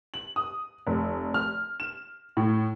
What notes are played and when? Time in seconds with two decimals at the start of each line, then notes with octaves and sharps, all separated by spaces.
0.14 F#7
0.36 D#6
0.87 F1
1.34 F6
1.80 E7
2.37 A2